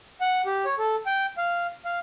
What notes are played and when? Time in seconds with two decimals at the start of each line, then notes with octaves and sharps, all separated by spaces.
0.21 F#5
0.46 G4
0.65 C#5
0.79 A4
1.06 G5
1.38 F5
1.85 F5